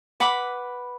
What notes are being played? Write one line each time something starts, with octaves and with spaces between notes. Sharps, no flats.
B4 F#5 B5 D6